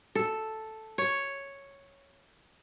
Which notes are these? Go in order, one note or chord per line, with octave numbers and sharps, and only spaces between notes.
A4
C#5